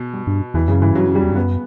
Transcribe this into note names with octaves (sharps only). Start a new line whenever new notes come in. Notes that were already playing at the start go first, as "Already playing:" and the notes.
Already playing: B2
G2
G2
E2 E3
F#2 C#3
G2 E3
G2 F#3
F#2
G3
E2
G2
F#2 B3